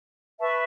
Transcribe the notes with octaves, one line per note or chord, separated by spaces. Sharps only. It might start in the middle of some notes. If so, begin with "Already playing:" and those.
B4 E5 A5 C#6